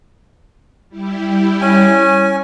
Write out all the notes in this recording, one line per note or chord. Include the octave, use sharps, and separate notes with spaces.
G3 E4 G4
C#4 G#5